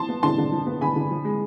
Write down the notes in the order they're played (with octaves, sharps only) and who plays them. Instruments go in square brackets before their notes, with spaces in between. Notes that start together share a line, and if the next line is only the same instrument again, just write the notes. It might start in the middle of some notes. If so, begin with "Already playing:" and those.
Already playing: [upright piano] F3 A5 C6
B3
D3 A5 C6
D3
F3
B3
D3 G#5 B5
D3
F3
G#3